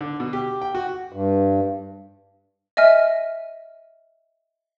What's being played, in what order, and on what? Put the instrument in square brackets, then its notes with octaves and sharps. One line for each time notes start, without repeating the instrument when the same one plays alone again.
[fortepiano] D3
B2
G4
G5
F#4
[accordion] G2
[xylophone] D#5 E5 G#5 F6